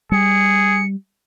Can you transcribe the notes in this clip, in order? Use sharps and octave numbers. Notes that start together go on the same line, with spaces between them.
G3 G#4 C#7